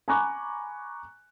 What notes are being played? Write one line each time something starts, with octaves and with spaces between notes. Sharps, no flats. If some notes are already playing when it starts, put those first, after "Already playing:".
G#5 A#5 B5 C#6 D6 F#6